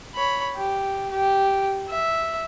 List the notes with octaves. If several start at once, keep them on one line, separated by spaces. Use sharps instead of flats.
C#5 B5
G4
G4
E5